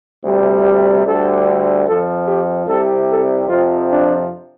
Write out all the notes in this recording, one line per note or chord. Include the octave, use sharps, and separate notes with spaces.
D2 C3 G3
G4
D2 D3 G3 A4
F2 F3 A4
G4
C2 C3 G3 A4
A4
F2 C3 F3 F4
D4